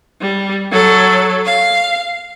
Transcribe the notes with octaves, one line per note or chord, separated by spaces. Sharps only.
G3
F#3 A4
F5